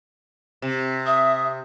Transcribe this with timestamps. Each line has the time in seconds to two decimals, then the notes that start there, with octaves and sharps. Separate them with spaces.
0.62 C3
1.06 E5 D#6